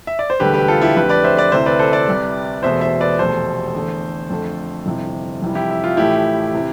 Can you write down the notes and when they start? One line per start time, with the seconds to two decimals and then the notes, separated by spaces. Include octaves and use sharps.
0.07 E5
0.19 D5
0.30 C5
0.40 E1 D2 D3 G3 G4 B4
0.54 G4 B4
0.68 F4 A4
0.82 E4 G4
0.96 F2 D3 A3 G4 B4
1.09 B4 D5
1.24 C5 E5
1.37 B4 D5
1.52 D2 C3 E3 C5 E5
1.66 B4 D5
1.79 A4 C5
1.93 B4 D5
2.08 C2 C3 G3
2.63 E1 E2 B2 A3 C5 E5
2.81 C5 E5
3.01 B4 D5
3.19 F1 E2 B2 A3 A4 C5
3.74 E2 D3 A3
4.30 F2 D3 A3
4.86 G1 F2 C3 E3
5.42 F2 C3 E3 G3
5.55 E4 G4
5.70 E4
5.84 F4
5.97 A1 A2 F3 A3 E4 G4
6.54 C3 E3